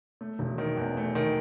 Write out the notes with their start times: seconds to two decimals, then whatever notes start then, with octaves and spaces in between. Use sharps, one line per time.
0.21 A3
0.39 E1
0.58 D#3
0.77 E2
0.97 A3
1.15 D#3